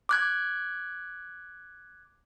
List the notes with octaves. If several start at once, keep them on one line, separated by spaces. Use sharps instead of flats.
D6 F#6 G#6